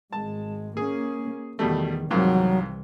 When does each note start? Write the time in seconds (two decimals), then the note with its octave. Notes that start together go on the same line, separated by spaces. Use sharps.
0.13 G#1 G#3 A5
0.77 A#3 C#4 G#4
1.59 E2 B2 D#3 G3 A3
2.11 C2 F2 G#2 D#3 E3 F#3